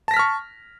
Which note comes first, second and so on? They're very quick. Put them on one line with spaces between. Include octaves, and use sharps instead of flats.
A5 A#6 B6 F6 C#6